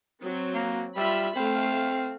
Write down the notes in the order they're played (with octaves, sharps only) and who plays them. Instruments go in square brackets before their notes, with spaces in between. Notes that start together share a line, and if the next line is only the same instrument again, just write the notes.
[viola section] F#3 C4
[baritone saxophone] A#3
[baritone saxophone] G3 [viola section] F4 E5 B5
[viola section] A3 F5 [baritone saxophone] C4